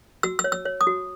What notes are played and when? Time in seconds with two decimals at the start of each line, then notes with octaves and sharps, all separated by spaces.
0.23 F#4 E6
0.39 E6
0.44 C#5
0.52 E6
0.65 C#5
0.81 D#6
0.87 F#4